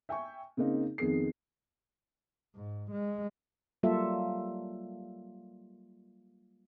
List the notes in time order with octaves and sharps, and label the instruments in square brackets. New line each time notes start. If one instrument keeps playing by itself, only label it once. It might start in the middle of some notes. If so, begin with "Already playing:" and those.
[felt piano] E5 G5 G#5 C#6
C#3 A#3 C4 D#4
F2 D#3 B3 G#4 C7
[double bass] G#2
G#3
[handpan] F#3 G3 A#3 F4 A4 E5